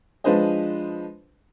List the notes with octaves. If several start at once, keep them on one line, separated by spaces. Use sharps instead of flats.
F3 G#3 D4 B4 C5 D#5